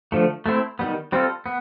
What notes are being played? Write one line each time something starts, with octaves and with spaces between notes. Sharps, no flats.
D3 F3 A3
A3 C4 E4
D#3 G3 B3
G3 C4 F4 A4
B3